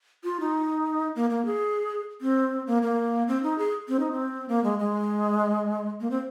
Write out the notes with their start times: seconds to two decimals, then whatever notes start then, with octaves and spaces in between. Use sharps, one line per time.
0.24 F4
0.40 D#4
1.16 A#3
1.30 A#3
1.46 G#4
2.21 C4
2.67 A#3
2.82 A#3
3.28 C4
3.43 D#4
3.58 G#4
3.88 C4
4.00 D#4
4.12 C4
4.49 A#3
4.64 G#3
4.79 G#3
6.00 A#3
6.11 C4